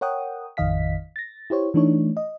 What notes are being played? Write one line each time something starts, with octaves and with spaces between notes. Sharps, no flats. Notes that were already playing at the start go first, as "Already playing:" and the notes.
A#4 C#5 F#5 G5 D#6
A1 F2 D#3 D#5 F5 B6
A6 A#6
E4 G4 C5 C#5
E3 A3 D4 D#4 C#5
D#5